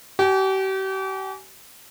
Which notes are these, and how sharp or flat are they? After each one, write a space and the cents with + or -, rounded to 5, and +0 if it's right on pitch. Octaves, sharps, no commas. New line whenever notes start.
G4 -40 G#5 +5